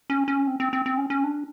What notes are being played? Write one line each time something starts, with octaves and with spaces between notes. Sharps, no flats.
C#4
C#4
C4
C4
C4
C4
C#4
C#4
D4